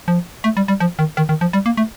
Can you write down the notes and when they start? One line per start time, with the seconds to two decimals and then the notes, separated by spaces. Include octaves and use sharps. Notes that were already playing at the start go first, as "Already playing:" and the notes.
0.08 F3
0.44 A3
0.57 G3
0.68 G3
0.80 F3
0.99 D#3
1.17 D#3
1.29 D#3
1.41 F3
1.53 G3
1.66 A#3
1.77 A3